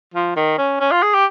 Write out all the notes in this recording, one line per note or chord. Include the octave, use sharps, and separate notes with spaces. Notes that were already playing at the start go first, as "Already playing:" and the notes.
F3
D#3
C#4
C#4
F4
G#4
G4